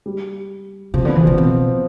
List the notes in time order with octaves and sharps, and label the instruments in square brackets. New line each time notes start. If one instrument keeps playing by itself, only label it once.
[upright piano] G3
[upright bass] C3 [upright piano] F3
[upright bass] D3 [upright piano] B3
[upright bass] E3
[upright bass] C3 [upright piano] F3
[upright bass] B2 [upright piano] C4